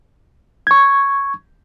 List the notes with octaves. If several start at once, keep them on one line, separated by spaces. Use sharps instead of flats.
C#6 G#6